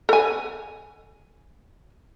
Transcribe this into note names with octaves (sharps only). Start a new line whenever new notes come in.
A4 G#5